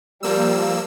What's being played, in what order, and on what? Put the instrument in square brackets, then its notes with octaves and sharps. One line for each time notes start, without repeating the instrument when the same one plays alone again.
[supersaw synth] F3 A#3 E6 [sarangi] G3